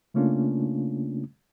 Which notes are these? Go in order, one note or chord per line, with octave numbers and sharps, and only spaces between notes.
C#3 A3 A#3 C#4 D4 F4